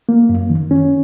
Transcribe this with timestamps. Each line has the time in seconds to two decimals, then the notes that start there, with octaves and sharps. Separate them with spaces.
0.09 A#3
0.29 F#2
0.50 D#3
0.71 C#4